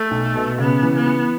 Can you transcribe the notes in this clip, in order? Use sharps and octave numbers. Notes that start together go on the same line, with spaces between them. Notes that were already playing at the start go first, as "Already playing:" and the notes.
Already playing: A3
B1
B2
C#3 B3
E3
B3
E3